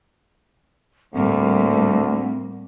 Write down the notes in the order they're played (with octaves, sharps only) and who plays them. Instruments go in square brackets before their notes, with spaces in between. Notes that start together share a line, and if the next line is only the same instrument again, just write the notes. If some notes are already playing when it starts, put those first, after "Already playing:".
[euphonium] D2 [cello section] A2 G3 A#3 [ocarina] C4